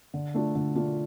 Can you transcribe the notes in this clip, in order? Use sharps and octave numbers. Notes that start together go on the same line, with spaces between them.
D3
A3 D4 F4
D3
A3 D4 F4